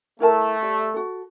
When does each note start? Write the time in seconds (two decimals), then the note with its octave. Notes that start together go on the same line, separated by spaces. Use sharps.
0.20 A3 E4 A#4 A5
0.62 G4 D5
0.94 F#4 A4